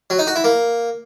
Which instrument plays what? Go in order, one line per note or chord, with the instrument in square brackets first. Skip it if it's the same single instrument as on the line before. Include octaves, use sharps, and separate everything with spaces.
[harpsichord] F#3
D#4
F#4
E4
A#3